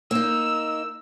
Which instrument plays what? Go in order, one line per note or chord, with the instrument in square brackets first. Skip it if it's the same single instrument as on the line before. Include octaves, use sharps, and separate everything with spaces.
[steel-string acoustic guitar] A#3 D#4 [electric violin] E6